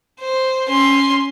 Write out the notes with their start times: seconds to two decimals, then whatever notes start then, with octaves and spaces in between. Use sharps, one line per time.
0.20 C5
0.69 C#4 C6